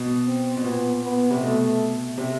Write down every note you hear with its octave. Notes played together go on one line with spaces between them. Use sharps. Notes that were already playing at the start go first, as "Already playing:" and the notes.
Already playing: B2
C4
B2
A#2 B3
B3
C3
B2 A3
C3